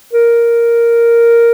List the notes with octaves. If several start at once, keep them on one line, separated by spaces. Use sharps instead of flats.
A#4